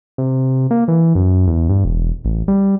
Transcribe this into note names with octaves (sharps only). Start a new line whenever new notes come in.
C3
A#3
E3
F#2
E2
G2
E1
A1
G3